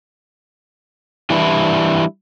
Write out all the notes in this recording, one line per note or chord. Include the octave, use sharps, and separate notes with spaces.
E3 G3 D4 E4